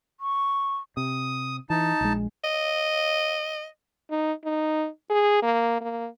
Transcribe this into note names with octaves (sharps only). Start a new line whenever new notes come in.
C#6
C3 D#6
E3 D#4 A5
A#1 G#3
D#5
D#4
D#4
G#4
A#3
A#3